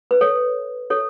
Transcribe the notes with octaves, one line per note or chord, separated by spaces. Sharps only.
B4
A4 C#5
A4 C#5